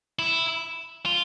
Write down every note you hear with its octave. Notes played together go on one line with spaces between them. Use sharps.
E4
F4